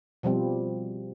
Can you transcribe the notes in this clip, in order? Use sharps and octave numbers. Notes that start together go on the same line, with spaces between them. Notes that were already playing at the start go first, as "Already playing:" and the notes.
B2 F3 G3 C4